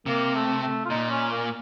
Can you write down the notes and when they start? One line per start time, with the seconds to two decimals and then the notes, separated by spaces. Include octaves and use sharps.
0.06 C3 A#3
0.35 A3
0.62 A3
0.85 F4
0.90 A#2 D#4
1.10 C#4
1.31 A#3